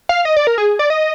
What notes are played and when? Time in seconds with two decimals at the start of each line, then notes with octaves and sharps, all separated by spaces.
0.09 F5
0.25 D#5
0.36 D5
0.47 A#4
0.58 G#4
0.79 D5
0.90 D#5